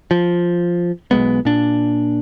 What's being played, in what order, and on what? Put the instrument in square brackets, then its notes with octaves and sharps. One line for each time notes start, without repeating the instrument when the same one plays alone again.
[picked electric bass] F3
B1 F#2 G#3 B3
A#2 D4